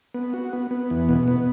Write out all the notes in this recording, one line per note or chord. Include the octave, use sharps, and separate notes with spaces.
B3
F#4
B3
B3
E2
B2
B3